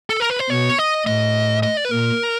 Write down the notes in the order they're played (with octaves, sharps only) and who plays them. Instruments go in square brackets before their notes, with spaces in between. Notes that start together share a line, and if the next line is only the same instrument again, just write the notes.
[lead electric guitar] A4
A#4
B4
C5
[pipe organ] B2 [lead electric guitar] C#5
[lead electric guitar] D#5
[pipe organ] A2 [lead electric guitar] D#5
[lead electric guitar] D#5
D5
B4
[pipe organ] A#2 [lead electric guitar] A#4